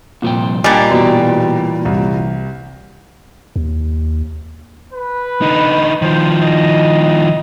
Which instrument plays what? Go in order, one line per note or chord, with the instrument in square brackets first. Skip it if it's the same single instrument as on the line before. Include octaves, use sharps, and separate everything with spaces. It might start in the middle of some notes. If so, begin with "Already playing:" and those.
[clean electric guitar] C2 F3 G5 [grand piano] A#2
[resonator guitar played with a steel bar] A#2 G3 [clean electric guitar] D4 [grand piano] D#5 D6 [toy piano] G#5
[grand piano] B2 [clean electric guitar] E3 G4 [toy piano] F#4
[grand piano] C2
[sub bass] D#2
[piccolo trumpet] B4
[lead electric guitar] D3 D#4
[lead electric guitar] D#3 F3 [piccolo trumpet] C5
[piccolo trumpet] D#5
D#5